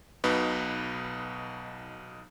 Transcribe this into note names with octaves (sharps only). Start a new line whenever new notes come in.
B1 B2 D#4 B4